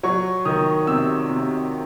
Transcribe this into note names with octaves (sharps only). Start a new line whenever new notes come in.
F#3 C#6
D#3 D#6
C3 E6
C3